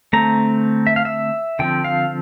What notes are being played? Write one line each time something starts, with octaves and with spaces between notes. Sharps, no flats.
D3 A3 C4 A#5
E5
F5
E5
D3 F3 C4 G5
F5